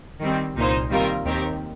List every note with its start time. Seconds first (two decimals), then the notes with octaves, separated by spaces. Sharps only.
0.20 D#3 G3 C4
0.55 C2 A#2 A#3 D#4 C5
0.90 D#3 G3 C4 F4 A#4
1.24 D#2 D#3 C4 G4 A#4